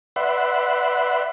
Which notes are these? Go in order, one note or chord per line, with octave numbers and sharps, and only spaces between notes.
B4 D5 E5 F#5 B5 C6